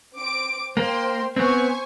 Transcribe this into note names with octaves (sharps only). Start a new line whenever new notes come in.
C4 D6 D7
A#3 C5 G5 C6
B3 C4 C5 G#5 C#6